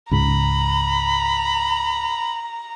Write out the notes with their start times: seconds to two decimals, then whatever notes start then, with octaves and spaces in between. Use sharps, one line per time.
0.11 C#2 G#2 A#5 B5